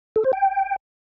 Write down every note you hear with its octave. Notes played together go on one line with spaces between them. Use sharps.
A4
C5
G5